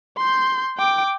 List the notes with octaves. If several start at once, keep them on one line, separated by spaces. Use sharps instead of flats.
C6 G6
G5 D6